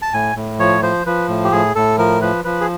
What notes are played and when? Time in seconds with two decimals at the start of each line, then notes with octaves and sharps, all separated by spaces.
0.02 A5
0.13 A2 G#5
0.36 A2
0.59 F3 C#5
0.82 F3 C5
1.06 F3 B4
1.29 A2
1.44 G4
1.52 A2 G#4
1.75 A2 A4
1.98 F3 A#4
2.22 F3 B4
2.45 F3 B4
2.61 G#4